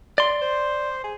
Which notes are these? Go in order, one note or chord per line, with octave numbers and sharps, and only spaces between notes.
D5 C6
C5
G#4